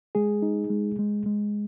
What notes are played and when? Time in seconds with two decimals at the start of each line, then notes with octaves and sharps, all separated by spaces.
0.15 G#3 G#4
0.42 D#4
0.70 G#3
0.99 G#3
1.26 G#3